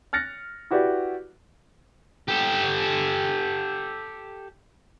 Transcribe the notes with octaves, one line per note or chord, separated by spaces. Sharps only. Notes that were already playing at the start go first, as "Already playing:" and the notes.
F6 F#6 A6 A#6 C#7
E4 F#4 G4 B4 D5
G4 A4